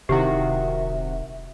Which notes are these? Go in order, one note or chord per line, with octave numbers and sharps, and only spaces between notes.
D#1 C3 D#3 E4 F#4 G4 E5